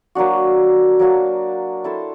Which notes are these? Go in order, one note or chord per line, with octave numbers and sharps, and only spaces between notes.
F#3 A#3 D4 F#4
F#3 A#3 D4 F#4
E4 A4 C5